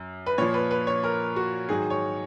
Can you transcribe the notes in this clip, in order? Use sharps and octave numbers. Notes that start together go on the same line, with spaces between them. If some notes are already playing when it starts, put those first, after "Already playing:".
Already playing: F#2
B4
A#2 F3 C#5
B4
B4
C#5
A#4
F#4
G#2 D#3 F#3 G#4
C#5